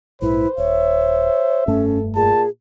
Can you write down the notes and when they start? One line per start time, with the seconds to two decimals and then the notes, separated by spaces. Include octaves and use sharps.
0.22 A#1 G#2 E4 B4 C5
0.58 D#1 C#5 E5
1.67 F1 G2 A3 C#4 A4
2.16 A#2 G#4 A5